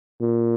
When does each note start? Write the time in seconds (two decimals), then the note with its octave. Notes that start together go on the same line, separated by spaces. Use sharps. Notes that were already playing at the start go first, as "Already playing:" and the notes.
0.20 A#2